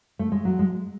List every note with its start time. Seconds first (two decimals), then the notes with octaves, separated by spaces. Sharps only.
0.19 A3
0.32 G#3
0.45 F#3
0.59 G#3